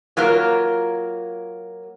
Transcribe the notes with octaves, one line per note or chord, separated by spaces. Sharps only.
F#3 A#3 F4 A#4